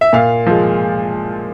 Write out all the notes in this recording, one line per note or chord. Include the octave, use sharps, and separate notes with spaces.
E5
A#2 F5
F3 G#3